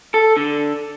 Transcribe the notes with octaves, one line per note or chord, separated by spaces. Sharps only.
A4
D3